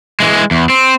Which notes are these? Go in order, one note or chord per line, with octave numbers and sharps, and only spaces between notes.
E3 G#3
E2
C4